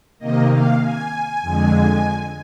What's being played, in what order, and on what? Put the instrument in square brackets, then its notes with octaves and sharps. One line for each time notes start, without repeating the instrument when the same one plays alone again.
[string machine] C3 D#3 A#3 D#5
F5
G#5
F2 D3 G#3